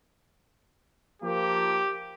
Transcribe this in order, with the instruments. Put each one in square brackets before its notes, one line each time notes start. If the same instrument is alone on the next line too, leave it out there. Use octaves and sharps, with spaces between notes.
[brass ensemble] F3 A#3 [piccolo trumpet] G4